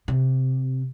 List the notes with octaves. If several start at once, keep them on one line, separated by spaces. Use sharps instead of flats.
C3